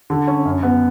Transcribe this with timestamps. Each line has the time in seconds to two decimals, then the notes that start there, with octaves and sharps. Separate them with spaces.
0.10 D3
0.27 C#4
0.45 F#2
0.63 B3